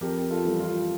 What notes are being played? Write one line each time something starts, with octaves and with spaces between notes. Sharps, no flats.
F2 G4 A#4
F4 A4
E3 G3
F4